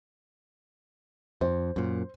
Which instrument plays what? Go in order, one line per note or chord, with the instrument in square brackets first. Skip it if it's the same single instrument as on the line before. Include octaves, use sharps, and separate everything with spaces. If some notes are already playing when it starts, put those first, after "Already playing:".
[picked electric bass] F2 [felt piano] C5
[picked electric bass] F#2 A#2